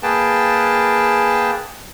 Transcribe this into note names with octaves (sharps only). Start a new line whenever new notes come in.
A#3 G#4 B4 G5 A5